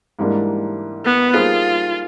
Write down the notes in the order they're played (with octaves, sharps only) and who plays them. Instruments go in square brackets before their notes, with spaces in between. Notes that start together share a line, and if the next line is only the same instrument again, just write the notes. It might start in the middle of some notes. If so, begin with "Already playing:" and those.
[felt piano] G#2 E3 G3 A#3 D4
[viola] B3
[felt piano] G3 A#3 D#4 G#4 C5 [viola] F4